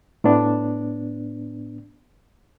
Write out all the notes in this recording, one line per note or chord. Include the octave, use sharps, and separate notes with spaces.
A2 B3 D4